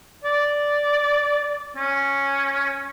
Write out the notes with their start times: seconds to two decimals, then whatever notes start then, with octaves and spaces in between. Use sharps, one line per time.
0.24 D5
1.77 C#4